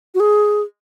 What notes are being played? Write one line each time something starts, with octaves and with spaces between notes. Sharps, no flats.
F#4
G#4